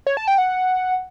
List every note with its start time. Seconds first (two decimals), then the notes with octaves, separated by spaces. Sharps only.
0.07 C#5
0.17 A5
0.28 G5
0.38 F#5